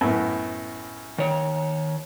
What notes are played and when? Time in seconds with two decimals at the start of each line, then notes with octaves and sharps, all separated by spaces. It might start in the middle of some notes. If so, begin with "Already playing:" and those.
0.01 F#2 A2 B3
1.18 D#3 C#5